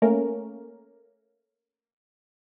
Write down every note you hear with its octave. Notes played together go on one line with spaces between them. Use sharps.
A3 A#3 C#4 A#4